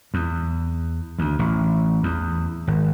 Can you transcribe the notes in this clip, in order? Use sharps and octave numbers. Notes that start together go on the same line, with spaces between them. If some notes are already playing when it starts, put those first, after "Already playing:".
E2
D2
A1
E2
G#1